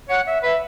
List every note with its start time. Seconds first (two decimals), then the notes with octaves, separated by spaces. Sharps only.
0.09 C#5 F#5
0.27 E5
0.43 B4 E5